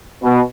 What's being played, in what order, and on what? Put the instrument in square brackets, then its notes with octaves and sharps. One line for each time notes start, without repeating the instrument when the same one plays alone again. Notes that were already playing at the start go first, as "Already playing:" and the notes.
[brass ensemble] B2